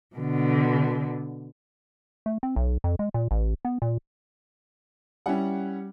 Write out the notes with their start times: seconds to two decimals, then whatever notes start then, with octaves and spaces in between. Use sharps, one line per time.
0.16 B2 D3
2.26 A3
2.43 C4
2.56 B1
2.84 F2
2.99 G#3
3.14 A#2
3.31 A1
3.65 B3
3.82 A#2
5.26 G3 C#4 E4 F#5